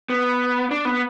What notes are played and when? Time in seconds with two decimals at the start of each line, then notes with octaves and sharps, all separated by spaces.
0.10 B3
0.71 D4
0.85 B3